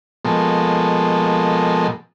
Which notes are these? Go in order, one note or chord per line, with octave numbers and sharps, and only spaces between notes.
B2 F3 G#3 A#3 A4